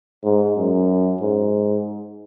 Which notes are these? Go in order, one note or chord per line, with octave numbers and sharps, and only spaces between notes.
G#2
F#2
G#2